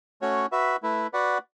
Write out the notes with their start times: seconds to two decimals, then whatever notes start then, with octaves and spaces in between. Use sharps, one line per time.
0.22 A3 C#4 F#4 C#5
0.52 F#4 B4 E5
0.83 A3 E4 B4
1.13 F#4 B4 D5 F#5